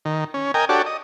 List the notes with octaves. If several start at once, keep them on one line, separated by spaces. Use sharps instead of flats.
D#3
C#4
A#4 D#5 G5 G#5
D4 F#4 G4 A4 C#5 D5
D#5